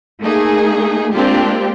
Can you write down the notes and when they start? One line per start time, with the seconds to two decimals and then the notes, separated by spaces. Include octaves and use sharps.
0.22 A3 A#3 D#4 G#4
1.14 G#3 A#3 C4 D4 F4 G4